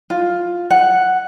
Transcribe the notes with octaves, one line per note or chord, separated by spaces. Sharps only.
F4
F#5